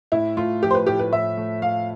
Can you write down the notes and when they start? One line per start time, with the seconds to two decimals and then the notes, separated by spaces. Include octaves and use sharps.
0.12 A2 E4
0.37 A3 F4
0.62 F3 G4
0.71 C5
0.75 B4
0.86 A2 G4
0.99 B4
1.12 A2 E5
1.37 A3
1.62 A3 F5